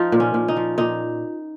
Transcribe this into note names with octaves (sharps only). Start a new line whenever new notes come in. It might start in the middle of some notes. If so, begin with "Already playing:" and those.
Already playing: F3 D#4 F4
A#2
C#4
A#2
D#4
F3
A#2 D#4